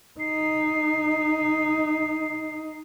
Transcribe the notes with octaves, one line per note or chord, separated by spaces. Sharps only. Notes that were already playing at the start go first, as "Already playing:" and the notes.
D#4 C7